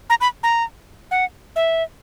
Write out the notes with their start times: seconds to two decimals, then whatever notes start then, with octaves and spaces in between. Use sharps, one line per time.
0.10 A#5
0.21 B5
0.43 A#5
1.11 F#5
1.56 E5